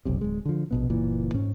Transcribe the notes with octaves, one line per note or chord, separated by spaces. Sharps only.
F1 B1 C3
D1 G#3
D3 F3
A#1 B2 B3
F#1 A#2 E3
G#2 C#4